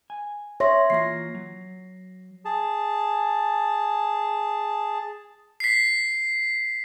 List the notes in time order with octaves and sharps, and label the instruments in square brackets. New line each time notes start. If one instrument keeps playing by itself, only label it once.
[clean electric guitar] G#5
[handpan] C#5 [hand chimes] E5 C6 A#6
[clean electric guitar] E3 A#3 F4 [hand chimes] A#6 C7
[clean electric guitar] F#3
[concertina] G#4 A5
[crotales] B6 C7